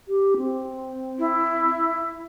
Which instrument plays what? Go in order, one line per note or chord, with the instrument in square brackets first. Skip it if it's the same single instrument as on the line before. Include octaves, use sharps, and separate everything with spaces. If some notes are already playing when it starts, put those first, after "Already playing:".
[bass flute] G4
C4
[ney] E4